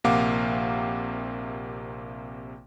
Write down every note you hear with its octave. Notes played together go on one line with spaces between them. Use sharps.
A#1 C3 A#3 F5 F#5 D6